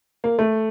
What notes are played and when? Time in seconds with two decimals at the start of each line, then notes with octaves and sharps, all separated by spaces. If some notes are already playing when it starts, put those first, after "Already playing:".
0.24 A#3
0.39 A3